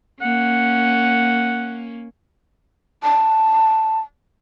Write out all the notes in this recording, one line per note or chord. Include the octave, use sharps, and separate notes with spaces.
A#3 C#4 F#5
A5